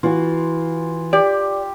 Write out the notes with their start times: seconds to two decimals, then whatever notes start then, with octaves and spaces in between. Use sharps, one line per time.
0.03 E3 F4 F#4
1.13 G4 D5